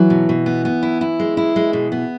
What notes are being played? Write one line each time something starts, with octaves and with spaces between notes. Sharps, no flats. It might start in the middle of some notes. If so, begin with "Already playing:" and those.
Already playing: E3 F#3
B2
B2
B3
B3
E4
E4
G#3
E4
G#3
B2
B3